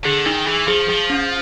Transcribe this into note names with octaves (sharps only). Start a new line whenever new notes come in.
D3 G#4
D#3 D#4
E3 G#4
F3 G#4
F3 G#4
C#4